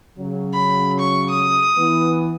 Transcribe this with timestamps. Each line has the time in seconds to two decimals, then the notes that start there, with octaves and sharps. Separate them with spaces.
0.17 C#3 F#3
0.53 B5
1.00 C#6
1.30 D#6
1.77 E3 B3